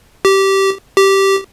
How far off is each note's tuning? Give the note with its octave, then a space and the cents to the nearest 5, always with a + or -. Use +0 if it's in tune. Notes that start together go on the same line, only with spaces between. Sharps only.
G4 -15
G4 -10